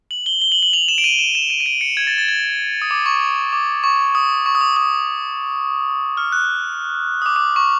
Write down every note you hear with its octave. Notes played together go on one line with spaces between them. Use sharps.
F#7
G7
G7
F#7
F#7
F7
E7
D7
D#7
E7
E7
D#7
D#7
D7
C#7
G#6
A6
A6
G#6
D#6
D6
C#6
D6
C#6
D#6
C#6
D#6
D6
D#6
F6
F#6
D#6
D6
D6
C#6